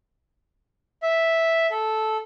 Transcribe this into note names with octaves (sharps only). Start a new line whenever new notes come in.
E5
A4